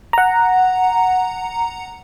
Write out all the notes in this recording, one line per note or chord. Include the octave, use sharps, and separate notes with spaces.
F#5 A#5